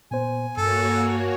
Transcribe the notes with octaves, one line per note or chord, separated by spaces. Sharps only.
A#2 B3 C5 G#5
G2 A#3 F#4 A4 C#5